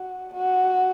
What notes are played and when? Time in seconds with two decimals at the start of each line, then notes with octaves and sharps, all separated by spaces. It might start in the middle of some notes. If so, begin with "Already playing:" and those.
Already playing: F#4
0.34 F#4